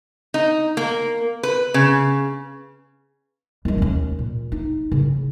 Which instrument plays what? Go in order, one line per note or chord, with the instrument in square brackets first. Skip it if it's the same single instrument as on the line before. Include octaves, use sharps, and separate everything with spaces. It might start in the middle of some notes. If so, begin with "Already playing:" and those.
[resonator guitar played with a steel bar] D#4
A#3
B4
C#3
[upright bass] D#2 G#3
D#2 C#4
A#2
D#4
C#3